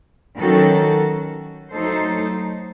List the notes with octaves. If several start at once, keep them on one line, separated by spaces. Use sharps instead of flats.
D#3 F#3 C#4 F#4 A4
F#3 A3 D#4 A4 C5